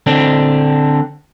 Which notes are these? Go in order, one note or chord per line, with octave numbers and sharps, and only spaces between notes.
D3 C4 D4